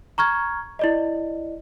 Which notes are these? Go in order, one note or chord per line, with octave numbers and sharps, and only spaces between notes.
A#5 C#6 F6 G#6
E4 D5 D#5